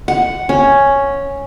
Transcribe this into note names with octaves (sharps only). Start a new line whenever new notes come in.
F#5
C#4